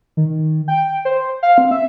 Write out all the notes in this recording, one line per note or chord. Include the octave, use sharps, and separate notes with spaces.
D#3
G5
C5
F5
C4
E5